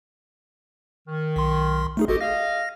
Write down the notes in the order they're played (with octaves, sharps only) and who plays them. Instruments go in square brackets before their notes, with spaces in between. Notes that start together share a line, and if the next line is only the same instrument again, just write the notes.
[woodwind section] D#3
[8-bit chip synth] B1 C6
A3 D#4 G#4
[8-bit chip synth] G#1 F#4 A4 [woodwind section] G4 D#5
[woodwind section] G#4 D#5 F5 [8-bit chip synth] A#6